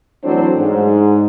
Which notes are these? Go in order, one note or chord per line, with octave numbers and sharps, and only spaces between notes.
E3 F#3 A3 C4 D4 C5
G#2